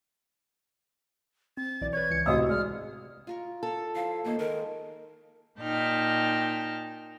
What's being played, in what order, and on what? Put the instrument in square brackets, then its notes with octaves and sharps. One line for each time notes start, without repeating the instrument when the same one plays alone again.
[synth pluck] C4 [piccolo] A6
[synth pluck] B1 E3 D5
[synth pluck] B4 C#5 [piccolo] G#6
[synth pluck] C#2 E3 C#7
[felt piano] A1 C3 E6 [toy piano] F#4 D#5 F5 [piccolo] D#6
[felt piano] G#3 [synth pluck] D5 [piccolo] F6
[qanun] F4 A#4 C#6
[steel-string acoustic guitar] A4 [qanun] C#5 F5
[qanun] F3 E4 [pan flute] F5
[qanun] D#3 C5 C#5 [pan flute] A#3
[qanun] D#3 G#3 C6 [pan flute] A#4
[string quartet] A#2 D#4 G5 A5 F6